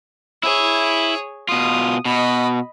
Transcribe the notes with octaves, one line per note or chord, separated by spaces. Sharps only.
E4 G#4 C#5
B2 F4 D#6
B2 D#5 B5